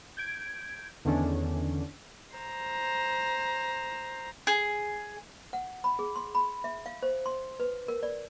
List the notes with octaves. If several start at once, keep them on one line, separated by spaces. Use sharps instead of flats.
G6 G#6 D7
E2 D3 D#3 C#4 D4
C5 A#5
G#4
F#5
B5
G#4
C6
B5
E5
F5
C5
C6
B4
A#4
D5